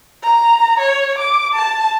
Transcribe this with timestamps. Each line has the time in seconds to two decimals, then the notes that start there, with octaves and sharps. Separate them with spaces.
0.23 A#5
0.80 C#5
1.18 D6
1.54 A5